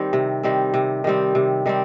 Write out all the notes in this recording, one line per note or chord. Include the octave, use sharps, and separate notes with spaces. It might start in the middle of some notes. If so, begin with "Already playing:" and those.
Already playing: D#3 G3 C4
C3
D#3 G3 C4
C3
D#3 G3 C4
C3
D#3 G3 C4